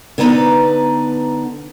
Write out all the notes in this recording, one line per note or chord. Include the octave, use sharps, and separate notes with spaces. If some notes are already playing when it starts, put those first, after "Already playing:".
D3 B3 D#4 B4 A#5